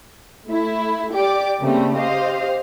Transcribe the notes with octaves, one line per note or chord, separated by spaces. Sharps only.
A3 E4
G4 D5 D6
C#3 G3 A3 A#3 C4
G4 C5 D#5 F5